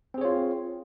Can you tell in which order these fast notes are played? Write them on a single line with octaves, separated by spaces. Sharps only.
C4 G#4 C#5 F4